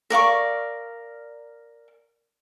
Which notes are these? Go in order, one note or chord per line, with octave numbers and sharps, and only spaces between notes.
A#4 D5 F5 C#6